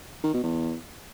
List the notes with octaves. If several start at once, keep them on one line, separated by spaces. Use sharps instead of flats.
D#3
B2
E2